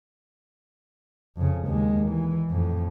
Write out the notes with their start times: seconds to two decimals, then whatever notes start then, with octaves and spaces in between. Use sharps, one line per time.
1.37 F2 C#3
1.67 D#2 G#3
2.10 E3
2.50 F2 A2